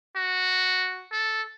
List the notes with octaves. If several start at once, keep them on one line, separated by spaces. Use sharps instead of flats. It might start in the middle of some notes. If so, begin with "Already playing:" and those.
F#4
A4